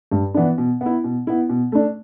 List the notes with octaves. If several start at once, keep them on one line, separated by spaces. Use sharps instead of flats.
G2
E3 B3 D4
B2
B3 E4
B2
B3 E4
B2
A3 D4